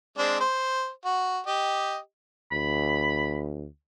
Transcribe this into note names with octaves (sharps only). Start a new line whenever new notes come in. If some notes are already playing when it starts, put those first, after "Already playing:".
G#3 C4 D4
C5
F#4
G4 D#5
D2 B5